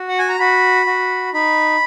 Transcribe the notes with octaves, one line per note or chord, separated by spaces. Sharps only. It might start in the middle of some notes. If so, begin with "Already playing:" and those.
Already playing: F#4
F#5
G#5
A#5
F#4 B5
F#4
D#4 B5